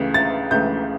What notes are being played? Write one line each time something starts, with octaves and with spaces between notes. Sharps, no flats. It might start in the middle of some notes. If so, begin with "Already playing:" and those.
Already playing: C#2 C#3 E3 A3
A6
C#2 C#3 E3 A3 G6